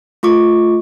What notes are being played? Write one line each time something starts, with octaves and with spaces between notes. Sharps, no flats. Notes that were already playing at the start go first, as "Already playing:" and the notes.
A3 F4 C#6 D6